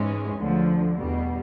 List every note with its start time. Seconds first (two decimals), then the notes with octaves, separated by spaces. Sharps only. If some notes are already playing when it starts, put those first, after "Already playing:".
Already playing: G#2 E3 G#3 C#4
0.39 D2 D3 F3
0.98 E2 B2 G3